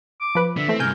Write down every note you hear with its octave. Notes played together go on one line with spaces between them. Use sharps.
D6
F3 B4
D3 E5
E3 A3 C4
G2 C3 A#4 G#5 G6